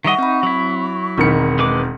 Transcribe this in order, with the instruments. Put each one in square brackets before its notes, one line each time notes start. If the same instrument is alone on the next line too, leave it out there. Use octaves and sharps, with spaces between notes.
[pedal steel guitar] D#3 G3 D#5 [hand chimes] E5 F#5 [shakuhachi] C#6
[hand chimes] C4 B5 [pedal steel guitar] D#4
[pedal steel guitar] F#3 E4
[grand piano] E1 D#3 C#7 [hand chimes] C4 B5
[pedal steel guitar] G#3 B4 D6